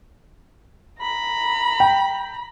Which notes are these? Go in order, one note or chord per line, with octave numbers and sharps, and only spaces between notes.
A#5 B5
G5